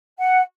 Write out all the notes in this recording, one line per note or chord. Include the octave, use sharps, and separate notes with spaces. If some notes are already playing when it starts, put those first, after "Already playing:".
F#5